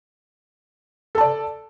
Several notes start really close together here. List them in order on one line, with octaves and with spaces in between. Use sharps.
A4 A5 D5